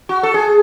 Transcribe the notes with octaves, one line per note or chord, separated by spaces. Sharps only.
F#4
A4
G#4